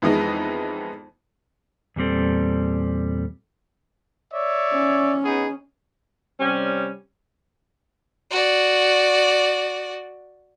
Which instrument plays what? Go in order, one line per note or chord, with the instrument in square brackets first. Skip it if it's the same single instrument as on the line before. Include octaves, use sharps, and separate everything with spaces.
[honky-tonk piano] F2 E3 G#3 B3 D#4
[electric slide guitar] E2 A#2 G3 C4 A4
[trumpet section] C#5 D5 E5
[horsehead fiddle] C#4
[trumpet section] B3 D#4 G#4
[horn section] C3 G3 C#4
[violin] F#4 D5